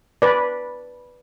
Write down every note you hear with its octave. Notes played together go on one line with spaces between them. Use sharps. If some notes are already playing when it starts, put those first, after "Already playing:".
B4 D5